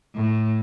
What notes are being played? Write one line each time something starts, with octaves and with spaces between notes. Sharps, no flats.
A2